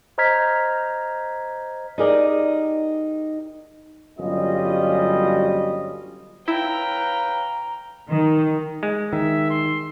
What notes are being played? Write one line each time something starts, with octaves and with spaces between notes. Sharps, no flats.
C5 D#5 A#5 F6 G#6 B6
D#4 G4 G#4 A#4 D5 D#5
G1 F#3 G3 C#4 F4 D#5
E4 B4 C#5 F5 G5 A#5
D#3
G#3
D#3 E5
C6